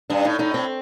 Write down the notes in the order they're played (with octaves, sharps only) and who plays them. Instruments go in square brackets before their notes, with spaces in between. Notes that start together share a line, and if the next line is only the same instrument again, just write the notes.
[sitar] G2 [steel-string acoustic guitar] D4
[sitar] A2 [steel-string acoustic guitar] D#4
[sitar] A2 [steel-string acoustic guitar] D#4
[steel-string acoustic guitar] C4